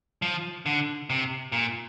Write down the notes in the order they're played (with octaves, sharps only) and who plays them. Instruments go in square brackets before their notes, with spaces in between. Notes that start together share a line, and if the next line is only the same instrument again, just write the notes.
[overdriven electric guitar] F3
D3
C3
A#2